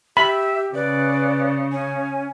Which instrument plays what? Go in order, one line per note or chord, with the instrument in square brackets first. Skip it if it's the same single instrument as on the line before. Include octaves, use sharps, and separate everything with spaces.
[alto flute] G4 [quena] E5 [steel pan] B5
[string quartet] C#3 [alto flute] B4 [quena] D5
[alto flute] C#4 [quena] G#5